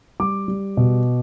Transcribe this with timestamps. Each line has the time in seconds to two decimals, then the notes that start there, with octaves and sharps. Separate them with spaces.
0.20 G3 D6
0.48 G3
0.77 B2